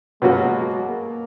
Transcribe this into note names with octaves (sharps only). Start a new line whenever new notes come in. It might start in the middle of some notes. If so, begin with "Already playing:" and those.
B2 F#3 G#3 A#3 C#4 F#4
A#3